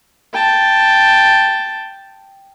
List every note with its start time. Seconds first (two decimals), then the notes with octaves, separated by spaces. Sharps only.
0.33 G5 A5